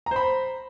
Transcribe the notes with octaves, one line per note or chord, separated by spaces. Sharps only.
C5 A#5 B5